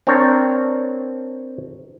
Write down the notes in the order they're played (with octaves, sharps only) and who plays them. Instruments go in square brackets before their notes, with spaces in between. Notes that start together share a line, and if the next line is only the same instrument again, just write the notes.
[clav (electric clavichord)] C4 D4 A#4 C#5